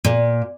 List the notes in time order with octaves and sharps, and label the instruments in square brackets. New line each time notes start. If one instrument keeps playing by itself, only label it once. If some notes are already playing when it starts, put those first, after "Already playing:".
[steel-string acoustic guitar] A#2